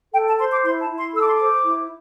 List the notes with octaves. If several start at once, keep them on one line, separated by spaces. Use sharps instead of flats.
A4 G5
A5
C5 C6
D6
E4 C6
A5
E4
C6
A4 E6
D6
C6
D6
C5
E4